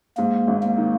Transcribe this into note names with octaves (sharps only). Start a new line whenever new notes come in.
G#2 A#3
G#1
A#3
D#3